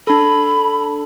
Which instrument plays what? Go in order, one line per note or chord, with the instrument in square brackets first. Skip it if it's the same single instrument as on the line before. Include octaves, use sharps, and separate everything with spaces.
[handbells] D4 A4 [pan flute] B5